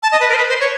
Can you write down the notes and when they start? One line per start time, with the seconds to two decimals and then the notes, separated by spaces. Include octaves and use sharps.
0.03 A5
0.12 D#5
0.20 B4
0.29 A#4
0.34 C5
0.38 B4
0.49 C5
0.60 C#5